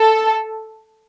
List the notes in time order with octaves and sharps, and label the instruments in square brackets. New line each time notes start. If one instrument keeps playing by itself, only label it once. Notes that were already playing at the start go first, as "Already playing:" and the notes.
Already playing: [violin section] A4